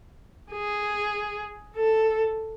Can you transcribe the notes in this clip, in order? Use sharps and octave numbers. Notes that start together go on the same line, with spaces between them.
G#4
A4